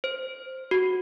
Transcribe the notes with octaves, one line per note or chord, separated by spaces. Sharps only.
C5
F#4